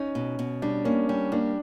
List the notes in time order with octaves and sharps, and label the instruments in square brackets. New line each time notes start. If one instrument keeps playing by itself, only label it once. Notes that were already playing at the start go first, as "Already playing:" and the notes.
Already playing: [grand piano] C#4 [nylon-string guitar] D#4
[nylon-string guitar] B2
B2
[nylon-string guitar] G3 [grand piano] D4
[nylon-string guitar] A#3 [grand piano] C#4
[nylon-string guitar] G3 [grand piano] C#4
[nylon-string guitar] A#3 [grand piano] D4